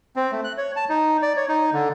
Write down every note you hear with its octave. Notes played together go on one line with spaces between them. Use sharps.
C4
A3
F#6
C#5
A5
D#4
D5
C#5
D#4
D3